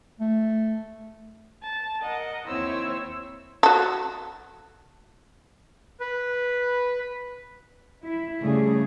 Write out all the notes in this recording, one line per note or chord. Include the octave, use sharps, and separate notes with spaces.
A3
A5
A#4 D#5 F#5
D#2 C4 E4 C5 C#5 E6
F#4 A4
B4
E4
C#3 G3 A3 G#4